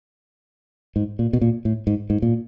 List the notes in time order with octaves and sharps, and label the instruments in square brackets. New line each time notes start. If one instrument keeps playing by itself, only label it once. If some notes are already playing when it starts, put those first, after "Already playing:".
[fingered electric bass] G#2
A#2
B2
A#2
A2
G#2
G#2
A#2